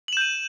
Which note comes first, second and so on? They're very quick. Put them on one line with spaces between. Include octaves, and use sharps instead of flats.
F#7 E7 G6 D#7